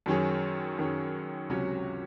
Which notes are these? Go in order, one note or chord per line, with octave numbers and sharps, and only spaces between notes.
F#2 D#3 F#3 C#4 G#4
F#2 D#3 F#3 C#4 G#4
C#2 C3 F#3 C#4 F#4